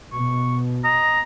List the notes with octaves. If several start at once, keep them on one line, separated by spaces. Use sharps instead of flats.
B2 C#6
D#5 A#5